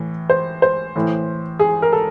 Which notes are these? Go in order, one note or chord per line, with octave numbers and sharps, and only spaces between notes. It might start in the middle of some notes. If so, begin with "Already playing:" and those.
Already playing: A2 E3
C5
C5
A2 E3
G#4
A#4
A4